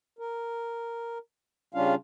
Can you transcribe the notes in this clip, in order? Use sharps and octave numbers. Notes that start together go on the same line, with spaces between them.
A#4
C#3 G3 C#4 D4 F4 F5